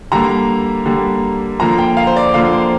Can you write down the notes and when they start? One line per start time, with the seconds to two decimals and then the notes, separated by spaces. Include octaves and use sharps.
0.12 D3 G3 A#3 A#5
0.86 D3 G3 A#3
1.60 D3 F3 A#3 A#5
1.78 G5
1.97 F5
2.07 C5
2.16 D5
2.34 D3 F3 A#3 F5
2.52 C5